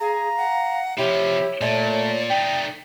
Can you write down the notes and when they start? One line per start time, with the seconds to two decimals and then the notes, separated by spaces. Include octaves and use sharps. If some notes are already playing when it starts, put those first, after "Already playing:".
0.01 G#4 F5 A#5
0.38 F#5
0.98 C3 F3 E4 G4 C#5
1.61 A#2 A3 D5
2.30 A3 D#4 G5